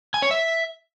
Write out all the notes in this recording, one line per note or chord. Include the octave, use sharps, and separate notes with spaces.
G#5
C#5
E5